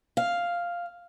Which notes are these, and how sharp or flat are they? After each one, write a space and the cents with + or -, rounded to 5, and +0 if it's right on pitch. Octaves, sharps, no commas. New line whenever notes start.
F5 +0